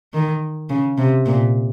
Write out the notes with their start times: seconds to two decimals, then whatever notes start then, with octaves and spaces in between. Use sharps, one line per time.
0.13 D#3
0.70 C#3
0.98 C3
1.26 A#2